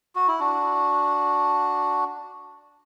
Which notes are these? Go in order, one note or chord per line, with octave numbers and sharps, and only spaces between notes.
F#4
E4
D4 F#4